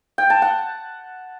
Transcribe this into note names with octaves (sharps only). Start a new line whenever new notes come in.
G5
A5
F#5